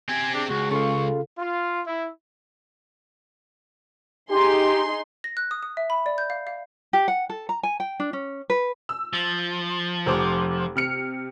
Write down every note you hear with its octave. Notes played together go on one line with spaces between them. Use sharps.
C4 G4 G#5
D4 G#4
C#2 F#4 G#4
C#3 F4 A4 F5 C#6
F4
E4
D#4 G4 G#4 C6
A#6
F#6
D#6
D#6
E5
B5
D5
G6
F5
F5
G4
F#5
A4
A#5
G#5
G5
D4
C#4
B4
E6
F3
F1 C5 D6
C3 F6 C#7